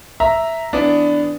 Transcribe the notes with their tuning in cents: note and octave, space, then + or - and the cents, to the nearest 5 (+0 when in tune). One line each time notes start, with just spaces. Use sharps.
E5 +0 A#5 +0
E3 +0 B3 +15 D4 +0